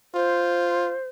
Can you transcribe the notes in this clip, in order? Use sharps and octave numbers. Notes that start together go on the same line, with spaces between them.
F4 C5